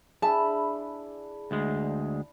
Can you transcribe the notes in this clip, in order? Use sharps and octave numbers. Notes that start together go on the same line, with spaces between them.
D4 E4 G#4 A5 B5
D2 G#3